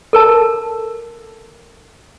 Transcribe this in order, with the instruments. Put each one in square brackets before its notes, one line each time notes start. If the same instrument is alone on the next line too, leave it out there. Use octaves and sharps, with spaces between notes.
[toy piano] A4 A#4 A5